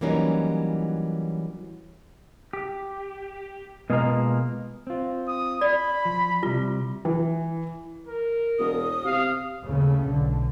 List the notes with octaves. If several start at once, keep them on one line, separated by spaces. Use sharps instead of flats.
E3 F#3 G3 A#3 C#4 D#4
G4
B2 G#3 A#3 B3 F4 A#5
C4 F4
D#6
D5 B5
F3
C3 G3 F4
E3
A#4
E1 D#6
C3 F5
D#2 A2 C#3 A3
B1 D3